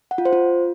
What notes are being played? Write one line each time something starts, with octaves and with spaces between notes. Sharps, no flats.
F#5
F4
C5
F4